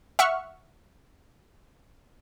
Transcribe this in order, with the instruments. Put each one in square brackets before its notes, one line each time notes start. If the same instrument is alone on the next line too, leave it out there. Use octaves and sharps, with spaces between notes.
[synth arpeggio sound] E5 F#5 C#6 F6